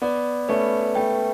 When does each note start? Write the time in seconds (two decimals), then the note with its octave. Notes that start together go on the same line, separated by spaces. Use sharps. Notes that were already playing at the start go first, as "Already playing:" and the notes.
0.02 B3 D5
0.48 A3 C#4 B4
0.95 A3 G5